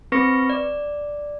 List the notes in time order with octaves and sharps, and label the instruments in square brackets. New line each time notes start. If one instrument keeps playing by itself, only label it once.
[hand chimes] C4 B4 C#6 A#6 C#7
D5